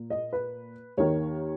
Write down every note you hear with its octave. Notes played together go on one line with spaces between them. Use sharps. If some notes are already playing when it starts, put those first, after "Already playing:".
Already playing: A#2 A#3
D#5
B4
D#2 D#3 A#3 C#5